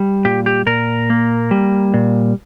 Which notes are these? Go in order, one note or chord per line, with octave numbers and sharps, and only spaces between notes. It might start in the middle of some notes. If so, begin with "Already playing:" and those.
Already playing: G3
A#2 G4
G4
A#2 A#4
A#3
G3
A#2